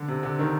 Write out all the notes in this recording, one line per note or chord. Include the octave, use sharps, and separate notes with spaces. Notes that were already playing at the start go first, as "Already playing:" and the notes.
Already playing: D3
C3
D3
D#3